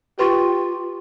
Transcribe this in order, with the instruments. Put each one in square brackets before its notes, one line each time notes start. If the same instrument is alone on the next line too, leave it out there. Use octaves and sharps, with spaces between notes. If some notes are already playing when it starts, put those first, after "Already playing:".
[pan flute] F4 [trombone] G4 [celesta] B4 C6 C#6